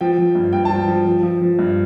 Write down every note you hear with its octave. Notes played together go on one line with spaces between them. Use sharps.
F3 G5
F3
G2
G2 G5
A5
F3
G5
F3
F3
F3
F3
G2